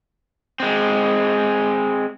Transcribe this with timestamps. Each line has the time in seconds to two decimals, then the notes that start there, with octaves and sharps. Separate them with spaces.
0.60 G#3 C4